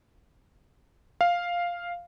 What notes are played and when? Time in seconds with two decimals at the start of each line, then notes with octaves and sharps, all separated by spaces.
1.21 F5